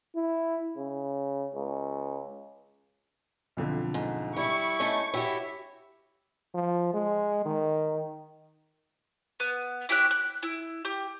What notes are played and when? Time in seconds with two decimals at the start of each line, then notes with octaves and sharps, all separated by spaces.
0.16 E4
0.78 C#3
1.55 C#2
3.57 B1 F2 D3
3.94 G#2
4.37 G3 E4 C#6
4.80 A3 C#4 D#4 C#5
5.14 E4 F#4 G4 C#5 E5 G5 G#5
6.54 F3
6.93 G#3
7.45 D#3
9.40 B3
9.89 E4 G4 C#5 F#6
10.11 F#6
10.43 E4
10.85 G4